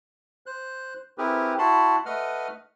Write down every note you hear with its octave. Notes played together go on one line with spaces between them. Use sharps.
C5 F#6
C4 E4 G4 G#4 A#4 B4
E4 F#4 F#5 A5 B5 C6
A3 B4 D#5 F#5 F6